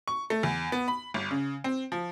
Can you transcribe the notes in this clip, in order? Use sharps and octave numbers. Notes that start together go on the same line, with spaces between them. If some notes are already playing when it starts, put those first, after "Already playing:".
C#6
A3
E2
B3
B5
G1
C#3
C4
F3